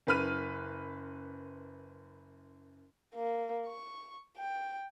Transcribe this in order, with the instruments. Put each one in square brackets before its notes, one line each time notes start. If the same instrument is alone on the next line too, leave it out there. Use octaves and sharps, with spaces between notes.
[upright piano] F#1 F#2 B4 B5 F6 D#7
[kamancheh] A#3
C#6
G5